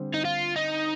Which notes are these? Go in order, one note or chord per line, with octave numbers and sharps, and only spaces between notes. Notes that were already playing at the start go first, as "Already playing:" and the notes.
Already playing: D3 G3 C4
D#4
F4
D#4